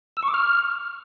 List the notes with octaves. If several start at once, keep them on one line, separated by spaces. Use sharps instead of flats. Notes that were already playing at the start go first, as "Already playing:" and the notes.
E6
C#6
D6
F6